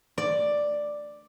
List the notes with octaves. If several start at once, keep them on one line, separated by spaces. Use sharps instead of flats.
D5